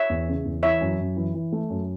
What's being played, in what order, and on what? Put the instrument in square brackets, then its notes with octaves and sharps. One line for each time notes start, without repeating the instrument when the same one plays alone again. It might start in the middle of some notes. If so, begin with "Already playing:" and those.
Already playing: [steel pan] C#5 E5
[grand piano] E2
C#3
E2
[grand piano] E3 [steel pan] C#5 E5
[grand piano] F#2
F#2
E3
E3
A3
F#2